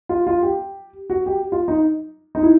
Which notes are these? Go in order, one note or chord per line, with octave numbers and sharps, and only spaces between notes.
F4
F4
G4
F#4
G4
F4
D#4
D#4
E4